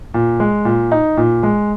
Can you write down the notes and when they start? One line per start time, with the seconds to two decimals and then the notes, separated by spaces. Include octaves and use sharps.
0.14 A#2
0.40 G#3
0.65 A#2
0.92 D#4
1.17 A#2
1.43 G#3